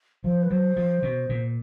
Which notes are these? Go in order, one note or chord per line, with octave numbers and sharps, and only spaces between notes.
F3 C5
B4
F#3 C5
F3
B2
A#2